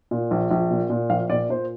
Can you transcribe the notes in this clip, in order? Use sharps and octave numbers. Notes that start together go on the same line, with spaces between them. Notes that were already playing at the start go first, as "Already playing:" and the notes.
A#2
A#1
A#1
A#2
A#2
A#1 F5
A#2 D5
A#2 C5